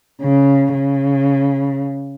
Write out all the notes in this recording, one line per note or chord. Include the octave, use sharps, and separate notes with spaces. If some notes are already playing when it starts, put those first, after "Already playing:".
C#3
C#3